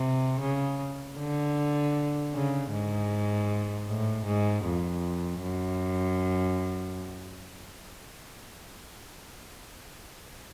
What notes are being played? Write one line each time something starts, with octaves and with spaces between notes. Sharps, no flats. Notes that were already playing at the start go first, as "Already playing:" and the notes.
Already playing: C3
C#3
D3
C#3
G#2
A2
G#2
F2
F#2